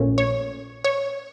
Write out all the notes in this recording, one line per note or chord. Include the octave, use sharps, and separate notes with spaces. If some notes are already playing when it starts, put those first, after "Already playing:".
Already playing: A#1 A#2 A3 C#4
C#5
C#5